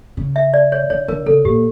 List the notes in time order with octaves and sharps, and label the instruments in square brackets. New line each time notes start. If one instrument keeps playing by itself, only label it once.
[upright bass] C#3
[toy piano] E5
D5
C#5
[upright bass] D3 [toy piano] C#5
[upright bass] D3 [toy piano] A#4
[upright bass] C#3 [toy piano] A4
[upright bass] A#2 [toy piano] G4